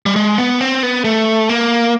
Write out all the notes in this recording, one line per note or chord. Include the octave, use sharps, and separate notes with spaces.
G3
G#3
B3
C4
B3
A3
A#3